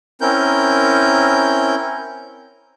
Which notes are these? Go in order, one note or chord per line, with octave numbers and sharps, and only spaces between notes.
C4 C#4 E4 A#4 G6